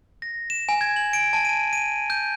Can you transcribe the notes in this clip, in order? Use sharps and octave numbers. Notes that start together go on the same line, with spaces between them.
A#6
E7
G#5
G#6
F#7
D7
A5
D#7
D#7
G6